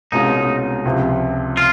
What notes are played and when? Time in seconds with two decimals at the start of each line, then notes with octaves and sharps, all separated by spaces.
0.12 C2 B2 G#3 C#4 D#4 F4
0.85 C#2 C3 F3
1.57 F4